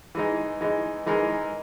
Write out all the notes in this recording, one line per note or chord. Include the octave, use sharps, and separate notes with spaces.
E3 G#3 D#4
E3 G#3 D#4
E3 G#3 D#4 A#4